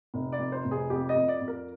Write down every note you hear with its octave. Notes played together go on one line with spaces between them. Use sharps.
F1
D5
F2
C5
F1
G#4
F2 G4
D#5
F2
D5
F2
A#4